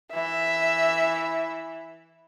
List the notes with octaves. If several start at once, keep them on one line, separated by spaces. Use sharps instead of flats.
E3 E5